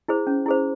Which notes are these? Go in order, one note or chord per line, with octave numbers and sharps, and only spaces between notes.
E4 G#4 C5
C#4
E4 G#4 C5